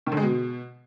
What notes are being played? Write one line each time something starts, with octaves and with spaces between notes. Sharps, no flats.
D#3
D3
G#3
B2